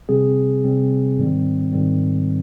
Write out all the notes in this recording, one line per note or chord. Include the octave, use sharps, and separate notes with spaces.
C3 G3 C4 G#4
C3 G3 C4
G#2 D#3 G3 C4
G#2 D#3 G3 C4